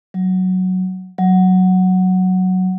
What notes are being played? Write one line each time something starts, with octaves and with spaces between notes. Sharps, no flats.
F#3
F#3